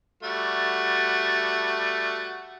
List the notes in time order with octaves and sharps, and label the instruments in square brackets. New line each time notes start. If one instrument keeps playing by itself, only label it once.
[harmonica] G3 A3 F#4